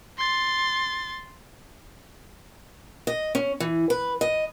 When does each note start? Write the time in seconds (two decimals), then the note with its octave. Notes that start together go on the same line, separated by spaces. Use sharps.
0.18 C6 A6
3.07 D#5
3.35 C#4
3.60 E3
3.90 B4
4.21 D#5